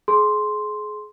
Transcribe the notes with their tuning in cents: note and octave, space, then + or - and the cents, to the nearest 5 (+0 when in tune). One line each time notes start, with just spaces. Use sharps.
G#4 +30 C6 +0